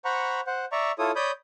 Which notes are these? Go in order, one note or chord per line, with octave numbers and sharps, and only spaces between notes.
C5 F#5 A#5 B5 C#6
C5 F#5
D5 E5 A#5 C#6
E4 F4 A4 C#5 D#6
C#5 D5 B5 D#6 G6